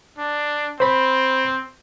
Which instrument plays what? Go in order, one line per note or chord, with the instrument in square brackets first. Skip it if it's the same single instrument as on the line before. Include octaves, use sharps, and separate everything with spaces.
[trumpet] D4
[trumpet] C4 [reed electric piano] C5 B5